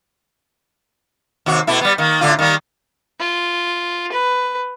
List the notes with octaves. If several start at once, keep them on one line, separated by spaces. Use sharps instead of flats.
D#2 C3 F#4
B2 A3 E4
G3 B3
D#3 A#3
A2 D3 F4
D#3 G3 A#3
F4
B4